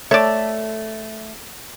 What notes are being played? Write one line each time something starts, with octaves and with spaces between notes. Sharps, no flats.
A3 C#5 D5